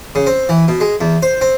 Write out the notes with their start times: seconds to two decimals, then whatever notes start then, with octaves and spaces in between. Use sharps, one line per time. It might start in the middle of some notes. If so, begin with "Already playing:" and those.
0.15 C#3
0.27 C4
0.49 E3
0.68 B2
0.81 G#3
1.01 E2
1.22 C5
1.41 C4